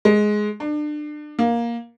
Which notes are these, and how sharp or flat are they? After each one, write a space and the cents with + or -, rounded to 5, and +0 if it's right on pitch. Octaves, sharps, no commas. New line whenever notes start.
G#3 +10
D4 +30
A#3 +10